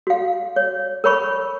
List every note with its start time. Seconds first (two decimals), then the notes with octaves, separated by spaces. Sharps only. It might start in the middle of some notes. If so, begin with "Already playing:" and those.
0.07 F#4 F5
0.56 C#5
1.04 A#4 C#5 B5 C#6